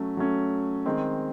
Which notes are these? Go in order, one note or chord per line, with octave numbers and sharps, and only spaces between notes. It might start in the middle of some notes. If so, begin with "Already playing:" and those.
Already playing: F#3 A3 C#4
F#3 A3 C#4
D#3 G#3 C4